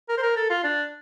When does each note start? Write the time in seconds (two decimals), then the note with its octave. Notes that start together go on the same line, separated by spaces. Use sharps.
0.09 A#4
0.18 C5
0.23 A#4
0.36 A4
0.50 F4
0.64 D4